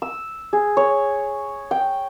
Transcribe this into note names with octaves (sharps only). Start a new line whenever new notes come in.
E6
G#4
C#5
G5